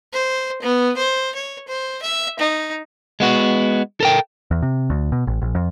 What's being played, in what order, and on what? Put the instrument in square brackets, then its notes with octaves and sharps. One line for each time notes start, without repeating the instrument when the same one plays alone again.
[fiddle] C5
B3
C5
C#5
C5
E5
D#4
[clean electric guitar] G#3 B3 F#4
A4 A#4 G5
[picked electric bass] E2
C3
D2
B2
A1
A#1
F2